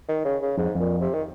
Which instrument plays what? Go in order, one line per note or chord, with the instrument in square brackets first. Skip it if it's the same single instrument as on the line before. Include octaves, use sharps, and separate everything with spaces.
[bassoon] D#3
C#3
C#3
[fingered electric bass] F2 [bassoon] G#2
[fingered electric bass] F2
[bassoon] A#2
C3
D#3